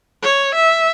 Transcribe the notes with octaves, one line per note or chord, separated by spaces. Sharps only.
C#5
E5